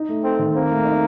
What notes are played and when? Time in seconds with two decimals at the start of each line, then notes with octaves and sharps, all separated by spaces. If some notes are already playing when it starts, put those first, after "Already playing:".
Already playing: D#4
0.09 A3
0.23 C4 A4
0.39 D#3
0.55 A#3 C4
0.70 A3
0.85 D#4